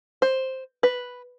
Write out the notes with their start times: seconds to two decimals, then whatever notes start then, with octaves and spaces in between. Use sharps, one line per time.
0.22 C5
0.83 B4